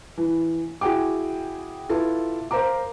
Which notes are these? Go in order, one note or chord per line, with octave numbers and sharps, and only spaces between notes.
E3
E4 F#4 G#4 G5 D6
E4 F4 A4 B4
A#4 C5 F5 A#5 D6